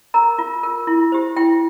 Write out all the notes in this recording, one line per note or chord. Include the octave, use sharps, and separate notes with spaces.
A#4 A#5
F4
A#4
E4
G4 C5
E4 G5